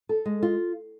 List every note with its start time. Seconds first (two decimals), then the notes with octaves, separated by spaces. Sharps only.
0.09 A4
0.26 G#3
0.43 F4